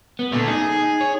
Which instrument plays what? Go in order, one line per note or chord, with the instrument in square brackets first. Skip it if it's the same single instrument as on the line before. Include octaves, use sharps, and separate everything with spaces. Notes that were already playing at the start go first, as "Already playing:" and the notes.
[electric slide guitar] B3
[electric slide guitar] A#2 [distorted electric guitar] D3 A3
[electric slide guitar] D#4 [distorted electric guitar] G#4
[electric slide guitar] C#5